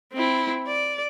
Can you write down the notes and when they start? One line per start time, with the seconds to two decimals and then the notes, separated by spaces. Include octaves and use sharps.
0.13 C4 E4
0.68 D5